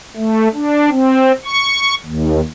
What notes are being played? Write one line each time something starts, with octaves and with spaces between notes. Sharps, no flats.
A3
D4
C4
C#6
D#2